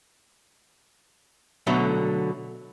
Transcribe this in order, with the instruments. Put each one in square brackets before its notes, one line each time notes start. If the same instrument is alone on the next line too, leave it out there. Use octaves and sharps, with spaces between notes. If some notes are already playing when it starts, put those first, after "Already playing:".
[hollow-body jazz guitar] B2 D3 F#3 A3